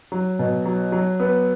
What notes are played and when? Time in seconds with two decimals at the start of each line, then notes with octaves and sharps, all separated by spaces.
0.12 F#3
0.39 B2
0.65 F#3
0.92 F#3
1.20 B3